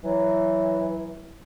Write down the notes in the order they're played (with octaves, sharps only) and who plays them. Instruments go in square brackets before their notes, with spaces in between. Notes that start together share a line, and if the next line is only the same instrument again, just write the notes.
[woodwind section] E3 F#3